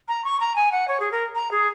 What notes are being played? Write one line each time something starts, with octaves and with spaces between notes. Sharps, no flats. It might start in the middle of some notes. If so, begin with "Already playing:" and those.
A#5
C#6
A#5
G#5
F#5
C#5
G#4
A#4
A#5
G#4